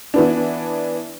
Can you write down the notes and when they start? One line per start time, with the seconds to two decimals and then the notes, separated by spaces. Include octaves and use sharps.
0.14 E3 B3 D4